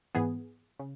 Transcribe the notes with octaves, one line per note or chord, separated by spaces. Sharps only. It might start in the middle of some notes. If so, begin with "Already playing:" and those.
G#2 E3 B3 G#4
C#3